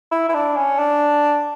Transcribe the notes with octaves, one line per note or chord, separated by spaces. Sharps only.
E4
E4
D4
C#4
D4